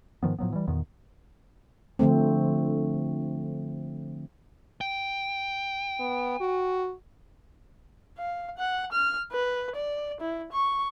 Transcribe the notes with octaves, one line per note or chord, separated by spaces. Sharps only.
G#2 D#3 F3 B3
A2 F3 F#3 B3
E3 G3
E2 A#2 D#3 B3
D3 F3 A3 C4
G5
B3
F#4
F5
F#5
F6
B4
D5
E4
C#6